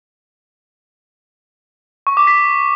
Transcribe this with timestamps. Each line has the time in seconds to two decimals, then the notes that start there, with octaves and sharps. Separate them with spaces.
2.07 C#6
2.17 D6
2.27 B6